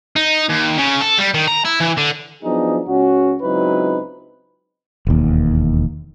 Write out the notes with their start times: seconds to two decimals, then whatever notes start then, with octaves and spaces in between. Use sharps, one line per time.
0.16 D#4
0.49 D#2
0.78 C#3
1.01 A4
1.18 G3
1.34 D#3
1.48 A#5
1.65 E4
1.81 E3
1.98 D3
2.43 F3 F#3 B3 D4 D#4 G#4
2.87 C#2 C#4 F#4
3.42 C#2 F#3 C4 D#4 E4 B4
5.07 E1 D#2